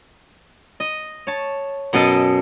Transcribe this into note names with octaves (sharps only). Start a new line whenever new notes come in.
D#5
C#5 A5
F#2 B2 A4 D#5 A5